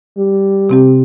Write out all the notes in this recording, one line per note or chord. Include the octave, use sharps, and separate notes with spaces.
G3
C3 C4 G4